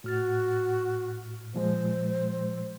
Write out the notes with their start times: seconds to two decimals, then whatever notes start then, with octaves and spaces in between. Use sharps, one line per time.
0.04 A2 F#4 F6 A6
1.55 A#2 F3 G#3 C5